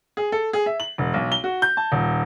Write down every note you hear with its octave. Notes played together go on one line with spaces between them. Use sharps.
G#4
A4
G#4
E5
F#7
E1
B1
G7
F#4
G6
A5
D#1